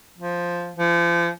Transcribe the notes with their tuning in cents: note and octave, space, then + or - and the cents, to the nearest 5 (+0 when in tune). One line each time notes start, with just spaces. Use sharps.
F3 +0
F3 -35